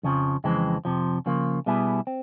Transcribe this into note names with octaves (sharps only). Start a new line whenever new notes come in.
F2 C#3 F3
F2 C#3 E3 G#3 C4
F2 C3 F3
C#3 F3 A#3
B2 G3 B3 E4 G#4
C4